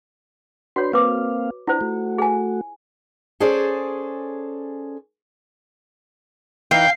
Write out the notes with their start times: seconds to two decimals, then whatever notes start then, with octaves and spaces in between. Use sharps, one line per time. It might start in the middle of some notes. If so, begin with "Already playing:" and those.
0.76 D4 F#4 B4 C#5 C6
0.93 A#3 C4 B4 F5 D6
1.67 D4 E4 F4 C5
1.81 A3 F#4
2.18 G#4 G#5
3.40 C#4 G#4 A4 C5 D5
6.71 E3 D#4 F5 G5 C7